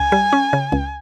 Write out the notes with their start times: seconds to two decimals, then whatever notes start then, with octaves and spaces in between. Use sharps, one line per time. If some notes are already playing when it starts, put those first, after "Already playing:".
Already playing: C#2 G#5
0.12 G3
0.33 C#4
0.53 C#3
0.72 C#2